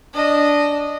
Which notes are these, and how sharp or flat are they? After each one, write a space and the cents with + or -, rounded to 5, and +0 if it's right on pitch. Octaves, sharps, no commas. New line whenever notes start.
D4 -10 D#5 -15